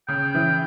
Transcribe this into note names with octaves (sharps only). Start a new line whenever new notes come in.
C#3 G5
E3